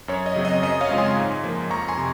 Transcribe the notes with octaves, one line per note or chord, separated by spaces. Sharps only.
F#2 C#5
D#5
C#3 F#3 C4
D#5
F#2 D#5
C#5 F5
C#3 G#3 C4 F4
G#5 C6
G#2
F3 A#3
F2 A#5 C#6
G#5 C6
C3